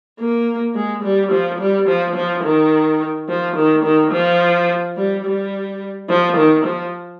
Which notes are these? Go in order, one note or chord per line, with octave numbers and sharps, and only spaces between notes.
A#3
G#3
G3
F3
G3
F3
F3
D#3
F3
D#3
D#3
F3
G3
G3
F3
D#3
F3